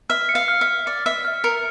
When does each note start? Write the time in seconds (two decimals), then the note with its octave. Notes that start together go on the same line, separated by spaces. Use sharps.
0.10 E5 F6
0.29 C#7
0.35 F5
0.48 F6
0.61 E5
0.68 F6
0.86 D5 C#7
1.06 E5 F6
1.25 F6
1.44 A#4 C#7